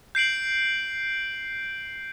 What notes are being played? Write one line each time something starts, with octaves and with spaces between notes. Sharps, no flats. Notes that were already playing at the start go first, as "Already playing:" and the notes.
G6 C7 D7 F#7